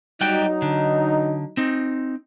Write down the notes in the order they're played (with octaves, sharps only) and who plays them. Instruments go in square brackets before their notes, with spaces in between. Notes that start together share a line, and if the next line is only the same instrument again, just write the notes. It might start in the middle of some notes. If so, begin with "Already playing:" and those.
[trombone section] F#3 D#4 [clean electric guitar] G3 F#4 G5
[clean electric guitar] D3
C4 D#4